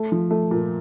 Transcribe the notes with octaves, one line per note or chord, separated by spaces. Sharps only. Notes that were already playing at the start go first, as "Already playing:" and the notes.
Already playing: A3
F3
A3
A#2